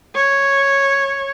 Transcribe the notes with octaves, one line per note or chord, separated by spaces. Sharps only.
C#5